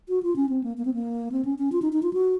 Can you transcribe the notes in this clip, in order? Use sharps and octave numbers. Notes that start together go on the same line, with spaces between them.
F#4
F4
C#4
C4
A#3
A#3
C4
A#3
C4
C#4
C#4
F4
D#4
D#4
F4
F#4